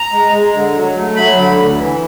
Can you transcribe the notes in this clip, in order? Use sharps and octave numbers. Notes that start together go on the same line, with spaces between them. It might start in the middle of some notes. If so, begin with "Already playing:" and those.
Already playing: A#5
G#3
G#3
D3
F#3
A3
F#3 B5
D3
D2
E3